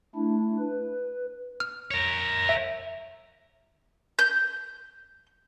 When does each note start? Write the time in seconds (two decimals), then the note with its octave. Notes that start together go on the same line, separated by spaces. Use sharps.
0.15 A3 D4 E4
0.59 B4
1.60 F6
1.91 A#4 C#5
2.49 E5
4.19 G6